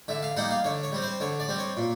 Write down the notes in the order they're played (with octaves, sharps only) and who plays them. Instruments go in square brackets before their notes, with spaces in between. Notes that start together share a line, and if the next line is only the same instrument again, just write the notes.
[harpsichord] D3 E5
F5
G3 A#3 D#4 F#5
F5
D3 C#5
C#5
G3 C4
C5
D3 C#5
D5
G3 C4
C#5
A#2